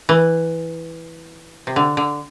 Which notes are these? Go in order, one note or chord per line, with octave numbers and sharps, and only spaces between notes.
E3
C3
D3
D3